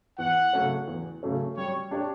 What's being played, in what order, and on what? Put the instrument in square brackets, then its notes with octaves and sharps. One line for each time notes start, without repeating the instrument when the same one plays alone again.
[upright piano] E2 [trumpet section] F#5
[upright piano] C#3 F#3 A3 C#4
E2
C#3 F#3 A3 C#4
[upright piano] G3 [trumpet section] C#5
[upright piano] D4 G4 C#5